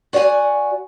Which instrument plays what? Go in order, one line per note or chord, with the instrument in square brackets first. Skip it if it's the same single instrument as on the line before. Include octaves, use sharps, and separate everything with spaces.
[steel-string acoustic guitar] F#4 D5 D#5 F#5 G#5